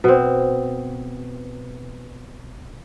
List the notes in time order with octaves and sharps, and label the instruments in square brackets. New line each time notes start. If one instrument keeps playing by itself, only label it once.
[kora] B2 C4